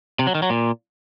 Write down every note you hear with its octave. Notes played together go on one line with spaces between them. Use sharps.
C3
F#3
D#3
F#3
A#2